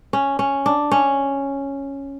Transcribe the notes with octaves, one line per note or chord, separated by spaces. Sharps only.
C#4
C#4
D4
C#4